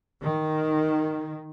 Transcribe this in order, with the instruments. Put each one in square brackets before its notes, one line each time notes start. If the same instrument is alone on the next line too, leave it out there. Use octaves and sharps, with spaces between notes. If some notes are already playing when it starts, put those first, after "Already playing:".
[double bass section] D#3